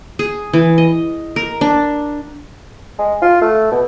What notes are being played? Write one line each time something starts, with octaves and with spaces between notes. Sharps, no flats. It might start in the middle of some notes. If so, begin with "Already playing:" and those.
G#4
E3
D#5
A#4
D4
G#3
F4
A3
B2